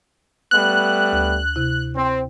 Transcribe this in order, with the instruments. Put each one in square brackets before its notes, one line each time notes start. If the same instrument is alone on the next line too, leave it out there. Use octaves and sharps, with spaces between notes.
[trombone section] G3 A3 B3 [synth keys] F#6
[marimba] D2
C3 E4
[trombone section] C4